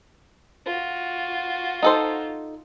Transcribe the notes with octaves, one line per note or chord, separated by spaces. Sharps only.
F4 F#4
D#4 A4 C5